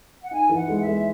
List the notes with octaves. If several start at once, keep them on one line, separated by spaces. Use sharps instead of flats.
F#5
D#4 G#5
E3
F#5
G#3
E5
G#3